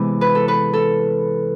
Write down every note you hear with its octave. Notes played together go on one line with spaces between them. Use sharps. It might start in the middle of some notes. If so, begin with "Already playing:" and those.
Already playing: C3 E3 G#3 B3
B4
A4
B4
A4